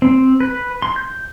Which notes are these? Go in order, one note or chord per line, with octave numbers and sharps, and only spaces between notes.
C4
B4
C6
G6